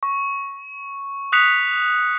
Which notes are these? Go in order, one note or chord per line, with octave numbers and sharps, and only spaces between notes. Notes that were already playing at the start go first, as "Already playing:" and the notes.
C#6
D#6 F#6 B6 C#7 F7